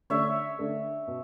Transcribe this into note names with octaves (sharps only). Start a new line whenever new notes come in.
D3 A3 D4 A4 C#5 E5
D3 A3 D4 A4
B2